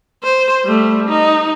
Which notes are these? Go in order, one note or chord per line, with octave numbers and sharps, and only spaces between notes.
C5
G3 A3
D#4